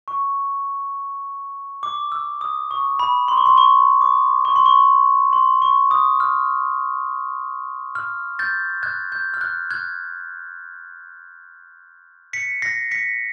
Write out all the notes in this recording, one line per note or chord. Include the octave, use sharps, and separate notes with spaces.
C#6
D6
E6
D#6
C#6
B5
C6
C#6
C6
C#6
D6
C#6
C6
C#6
C6
C#6
D#6
F6
F6
G6 A6
F#6 G#6
G6
F6
F#6
F#6 G#6
B6 C#7
A#6 C7
B6 C#7